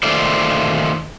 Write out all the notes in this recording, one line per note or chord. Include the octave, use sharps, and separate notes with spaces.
D#3 A3 A#3 F4 C5 D5